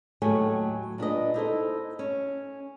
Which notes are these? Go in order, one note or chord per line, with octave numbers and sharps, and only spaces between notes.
D#2 A2 F#3 A3 G#5
A#2 D4 B4 D#5
D#4 E4 A4 C5
C#4